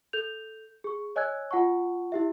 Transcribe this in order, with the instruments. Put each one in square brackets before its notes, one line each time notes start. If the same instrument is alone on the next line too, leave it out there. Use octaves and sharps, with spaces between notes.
[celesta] A4 G6 F7
G#4 C#6
C#5 D#5 G#5 E6 F#6 G#6
F4 F#5 A5 C#6
E4 G4 E5